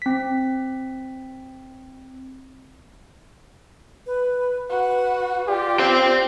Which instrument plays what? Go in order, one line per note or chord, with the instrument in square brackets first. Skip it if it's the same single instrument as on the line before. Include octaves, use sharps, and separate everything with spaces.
[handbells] C4 B6
[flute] B4
[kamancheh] F#4 [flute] B4
[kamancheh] F4 [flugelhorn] G4 [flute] D5
[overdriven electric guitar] C5 G5